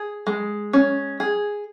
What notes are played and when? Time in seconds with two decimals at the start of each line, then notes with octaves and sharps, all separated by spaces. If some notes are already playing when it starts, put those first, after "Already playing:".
Already playing: G#4
0.27 G#3
0.73 C#4
1.20 G#4